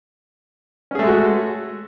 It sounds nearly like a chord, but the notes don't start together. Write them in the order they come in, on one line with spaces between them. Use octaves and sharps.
C#4 G#4 A3 G#3 F#4